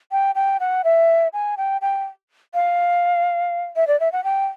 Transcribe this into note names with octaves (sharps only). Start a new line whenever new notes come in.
G5
G5
F#5
E5
G#5
G5
G5
F5
E5
D5
E5
F#5
G5